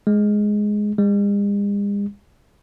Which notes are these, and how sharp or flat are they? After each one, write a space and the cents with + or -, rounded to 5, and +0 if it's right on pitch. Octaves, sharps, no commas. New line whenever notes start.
G#3 +5
G#3 -45